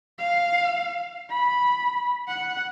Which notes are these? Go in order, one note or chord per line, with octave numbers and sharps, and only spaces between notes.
F5
B5
F#5